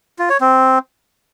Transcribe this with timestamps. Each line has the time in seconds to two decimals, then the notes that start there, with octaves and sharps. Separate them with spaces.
0.19 F4
0.30 C#5
0.41 C4